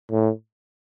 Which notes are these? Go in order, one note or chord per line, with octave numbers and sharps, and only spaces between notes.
A2